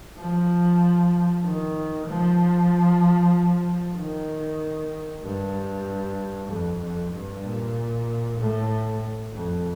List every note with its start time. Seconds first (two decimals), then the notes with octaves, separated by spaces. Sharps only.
0.17 F3
1.44 D#3
2.07 F3
3.96 D#3
5.23 G2
6.48 F2
6.81 F2
7.12 G2
7.43 A#2
8.38 A2
9.33 F2